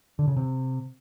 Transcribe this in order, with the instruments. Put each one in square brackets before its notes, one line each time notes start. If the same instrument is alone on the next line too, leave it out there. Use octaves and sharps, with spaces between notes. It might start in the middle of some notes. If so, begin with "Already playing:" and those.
[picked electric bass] D3
C#3
C3